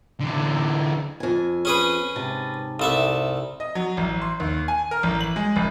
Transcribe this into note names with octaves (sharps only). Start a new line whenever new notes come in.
D3 E3
F2 G#5
C#4 G#4 B4
G#2 C3 A5
C2 A4 E5
D#5
F#3
A1
C6
D#2
G#5
A#4
A1
F#7
G#3
F#1